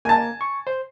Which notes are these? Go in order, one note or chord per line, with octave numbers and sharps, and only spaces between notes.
A#3 G#5 A5
C#6
C5